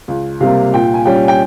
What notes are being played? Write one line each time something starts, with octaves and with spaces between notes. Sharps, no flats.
C#2
C3 G3 A#3 F5
A#2 G5
G#5
G3 C#4 G5
G5